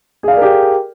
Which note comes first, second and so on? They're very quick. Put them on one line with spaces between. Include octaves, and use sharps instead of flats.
G#4 F5 D5 A#4 G4